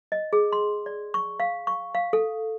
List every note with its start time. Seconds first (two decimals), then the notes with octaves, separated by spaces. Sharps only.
0.12 D#5
0.33 G#4
0.53 C6
0.86 D5
1.14 C#6
1.40 F5
1.67 C#6
1.95 F5
2.13 A4